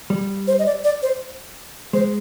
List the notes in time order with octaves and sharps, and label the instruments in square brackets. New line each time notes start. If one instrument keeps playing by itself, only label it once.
[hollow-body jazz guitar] G3
[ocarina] C5
D#5
D5
D5
C5
[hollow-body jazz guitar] G#3 [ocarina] C5